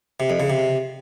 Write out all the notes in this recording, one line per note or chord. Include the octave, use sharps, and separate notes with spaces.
C3
F2
C#3
C3